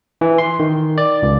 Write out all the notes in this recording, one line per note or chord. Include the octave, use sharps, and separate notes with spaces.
E3
C6
D#3
D5
C#2